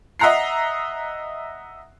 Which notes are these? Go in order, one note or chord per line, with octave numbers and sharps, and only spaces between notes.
D#5 E5 F#5 A#5 F#6 C7